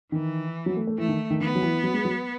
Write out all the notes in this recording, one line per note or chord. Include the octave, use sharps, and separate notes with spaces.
D#3 E3
F#3
A3
A3
E3 A3
D#3
D#3
D#3 B3
F#3
E3
F#3
G#3
F#3